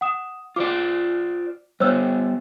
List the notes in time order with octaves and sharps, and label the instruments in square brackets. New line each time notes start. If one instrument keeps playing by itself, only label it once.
[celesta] F#5 D#6 E7
[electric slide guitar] F4 C5 D5 [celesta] D6
[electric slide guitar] G3 B3 [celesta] C5 C#5 E6